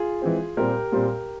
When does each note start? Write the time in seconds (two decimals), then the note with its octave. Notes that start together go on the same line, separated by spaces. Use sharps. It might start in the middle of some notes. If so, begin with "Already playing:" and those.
Already playing: F4 G#4
0.22 E3 G#3 C4
0.57 A#2 G3 C4 G4 A#4
0.92 A#2 G3 C4